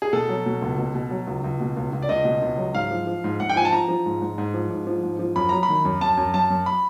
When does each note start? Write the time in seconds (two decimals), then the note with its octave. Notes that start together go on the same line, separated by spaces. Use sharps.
0.02 G#4
0.13 B2 A4
0.29 F#3
0.46 B2
0.62 C#2
0.78 B2
0.95 B2
1.11 F#3
1.27 C#2
1.44 C#2
1.60 B2
1.77 C#2
1.93 C#2
2.02 D5
2.09 C#2 D#5
2.25 B2
2.42 C#2
2.57 F#3
2.74 G#2 F5
2.91 F3
3.07 F3
3.24 G#2
3.40 G#2 F#5
3.50 G5
3.56 F3 G#5
3.65 A5
3.73 F3 A#5
3.88 F3
4.06 G#2
4.21 G#2
4.38 G#2
4.54 F3
4.70 G#2
4.87 F3
5.03 G#2
5.19 F3
5.36 F#2 B5
5.49 F#3 A#5
5.63 B5
5.69 D#3
5.85 F#2
6.01 F#2 A5
6.17 F#2
6.34 F#2 A5
6.50 F#2
6.66 B5